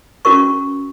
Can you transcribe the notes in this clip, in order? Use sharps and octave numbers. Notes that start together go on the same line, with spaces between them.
C#4 F#4 A#4 C#6